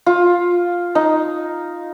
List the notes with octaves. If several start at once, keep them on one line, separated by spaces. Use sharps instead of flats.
F4
D#4